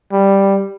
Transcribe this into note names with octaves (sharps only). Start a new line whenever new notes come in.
G3